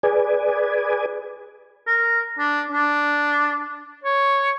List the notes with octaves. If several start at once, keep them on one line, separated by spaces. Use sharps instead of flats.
G#4 B4 D5 G#5
A#4
D4
D4
C#5